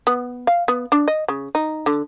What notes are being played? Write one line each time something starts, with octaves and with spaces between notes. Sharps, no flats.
B3
F5
B3
D4
D#5
C#3
D#4
D3